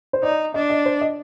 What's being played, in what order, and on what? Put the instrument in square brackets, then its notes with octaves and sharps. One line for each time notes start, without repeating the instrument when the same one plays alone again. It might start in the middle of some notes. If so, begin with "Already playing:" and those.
[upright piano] C5
[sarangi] D#4 [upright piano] D5
[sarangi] D4 [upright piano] D#5
[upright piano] D#5
C5
D#5